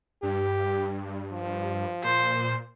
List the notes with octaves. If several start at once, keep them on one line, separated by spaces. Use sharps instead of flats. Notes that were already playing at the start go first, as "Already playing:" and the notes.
G2 G4
F3
A#2 C5